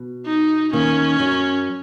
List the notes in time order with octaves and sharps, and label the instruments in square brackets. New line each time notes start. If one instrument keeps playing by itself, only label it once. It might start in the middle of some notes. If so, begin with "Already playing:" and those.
Already playing: [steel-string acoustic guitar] B2
[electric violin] D#4
[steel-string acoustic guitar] D#2 D#3 [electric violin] C#4
[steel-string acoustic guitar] F#2 F#3